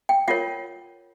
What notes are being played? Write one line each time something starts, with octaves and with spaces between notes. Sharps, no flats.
G5
F4 A#4 C#5 F#5